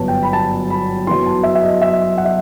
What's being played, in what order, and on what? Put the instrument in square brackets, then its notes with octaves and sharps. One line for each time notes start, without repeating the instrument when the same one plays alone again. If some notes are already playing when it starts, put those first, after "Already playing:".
Already playing: [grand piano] G1 F#2 F#3 B3 A5
G5
B5
A5
B5
F#2 F#3 B3 E4 C6
A5
E5
E5
D#5
E5
F#5
E5